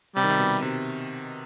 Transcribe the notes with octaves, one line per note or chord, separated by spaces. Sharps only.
C3 G3
D#3
C3
B2
C3